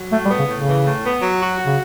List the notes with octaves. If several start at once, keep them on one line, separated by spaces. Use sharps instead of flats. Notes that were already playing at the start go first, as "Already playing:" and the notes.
Already playing: F#3
A2 A3
G3
B3
C#3
A2
C#3
E3
A2
B3
F#3
F#4
F#3
C#3